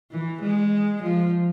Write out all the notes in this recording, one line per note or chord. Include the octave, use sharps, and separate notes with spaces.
E3
G#3
F3